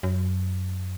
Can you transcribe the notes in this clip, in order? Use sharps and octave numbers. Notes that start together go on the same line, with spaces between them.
F#2